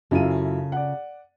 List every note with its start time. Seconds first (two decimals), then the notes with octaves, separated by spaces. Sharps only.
0.11 F#2 C#3 E4 F4 A4 D#7
0.72 D5 F#5